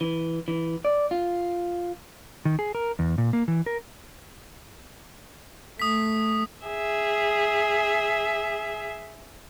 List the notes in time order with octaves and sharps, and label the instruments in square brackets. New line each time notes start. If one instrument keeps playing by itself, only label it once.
[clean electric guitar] E3
E3
D5
F4
[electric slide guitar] D#3
G#4
A#4
E2
A#2
A#3
E3
A#4
[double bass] A3 [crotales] D#6 B6
[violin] G#4 E5